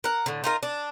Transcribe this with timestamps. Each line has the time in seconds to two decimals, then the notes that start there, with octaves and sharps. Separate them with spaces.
0.04 A#4 F#5
0.26 A2 D3
0.44 D#4 F4 A#4
0.63 D4